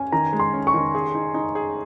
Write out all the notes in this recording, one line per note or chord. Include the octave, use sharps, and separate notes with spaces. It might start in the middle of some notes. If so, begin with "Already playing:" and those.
Already playing: C#4 G#5
D#3 A#5
G#3
C6
C#4
C#6
D#3
G#4
D#4
D#4
G#4